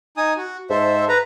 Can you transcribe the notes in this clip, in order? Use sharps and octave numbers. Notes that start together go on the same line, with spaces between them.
D#4 G#5 D#6
F#4
G#2 A4 C5 E5
B4 A#5